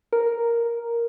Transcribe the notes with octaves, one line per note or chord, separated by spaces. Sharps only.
A#4